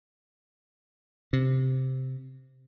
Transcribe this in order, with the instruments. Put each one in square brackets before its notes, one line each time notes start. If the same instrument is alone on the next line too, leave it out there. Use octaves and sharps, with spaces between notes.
[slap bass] C3